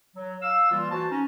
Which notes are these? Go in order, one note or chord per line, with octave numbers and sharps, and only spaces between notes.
F#3
F5 E6
E3 G3 A#3 F4
E3 F#4 C5 A5
C#4 D#4